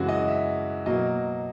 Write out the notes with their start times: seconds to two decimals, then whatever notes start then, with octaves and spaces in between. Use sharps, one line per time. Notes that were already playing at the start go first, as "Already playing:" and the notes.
Already playing: F#2 C#3 E3 G#3 F#4
0.09 D#5
0.28 E5
0.86 B2 F#3 A#3 D#5